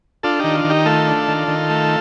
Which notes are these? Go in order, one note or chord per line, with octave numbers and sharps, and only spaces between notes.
D4 F4 A4
D#3 D#4 G4
F4
D#3
D#4 G4
A3 F4 A4
D4
D#3
D#3
A3